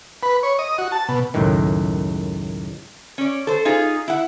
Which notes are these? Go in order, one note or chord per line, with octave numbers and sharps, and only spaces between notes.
B4
C#5
D#5
F#4
A5
B2
C#2 F#2 A2 D#3
C#4 D5
A4 C5
D#4 F4 G#4
E4 F#5